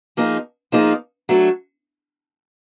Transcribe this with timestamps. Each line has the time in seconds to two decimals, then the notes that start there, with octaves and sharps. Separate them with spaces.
0.17 F3 A#3 D#4 G#4
0.72 F3 A#3 D#4 G#4
1.29 F#3 A3 D4